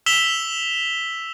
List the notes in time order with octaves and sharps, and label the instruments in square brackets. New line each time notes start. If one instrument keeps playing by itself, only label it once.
[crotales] E6 B6 E7 F7 G7